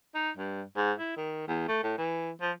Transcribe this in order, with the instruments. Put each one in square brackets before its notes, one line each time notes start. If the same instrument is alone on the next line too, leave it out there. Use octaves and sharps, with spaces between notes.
[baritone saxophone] D#4
G2
G#2
E4
D#3
E2
A3
A2
E3
F3